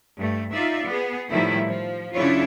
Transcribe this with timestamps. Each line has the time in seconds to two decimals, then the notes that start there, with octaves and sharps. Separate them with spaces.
0.19 G2 A3
0.54 D#4 F4 D5 E5
0.86 B3 G#4
1.29 A2 D#3 F3 G3 A3 E4
1.69 F3
2.13 F#2 C#3 D4 E4 F4 C#5